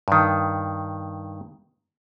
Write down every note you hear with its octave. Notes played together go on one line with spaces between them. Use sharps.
G2 D#3